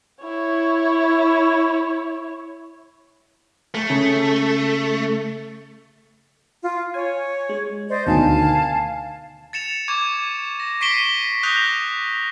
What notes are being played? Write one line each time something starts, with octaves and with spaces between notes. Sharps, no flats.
E4 C#5
A3
C#3
F4
C#5 G#5
G#3
C5 D5 D#5
D2 B2 D#3 F5 G#5 A5
A6 C#7 E7 F7
C#6 D6 G#6
A#6
C#6 B6 C7 D7 E7 G7
D#6 F#6 G6 A#6 F7